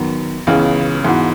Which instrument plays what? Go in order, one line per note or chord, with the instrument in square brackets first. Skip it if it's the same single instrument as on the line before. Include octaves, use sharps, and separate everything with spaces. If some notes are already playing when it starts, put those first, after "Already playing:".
Already playing: [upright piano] F#2 [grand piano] D#3 F#3 B3
[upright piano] C#2 C#3 [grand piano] E3 G#3 B3
[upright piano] G#2 [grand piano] E3 B3 F#4